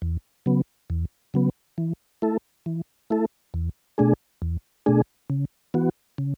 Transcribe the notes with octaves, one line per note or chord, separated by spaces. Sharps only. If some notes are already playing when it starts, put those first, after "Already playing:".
E2
C#3 F#3 B3
E2
C#3 F#3 B3
E3
A3 E4 A4
E3
A3 E4 A4
E2
B2 A3 D4 G#4
E2
B2 A3 D4 G#4
C#3
E3 B3 F#4
C#3